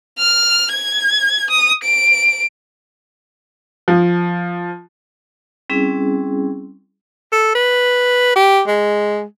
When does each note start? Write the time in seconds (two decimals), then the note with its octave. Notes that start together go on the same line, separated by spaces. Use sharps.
0.19 F6
0.72 G#6
1.51 D#6
1.84 D7
3.88 F3
5.70 G3 C4 C#4 E4 G#4
7.33 A4
7.55 B4
8.36 G4
8.68 G#3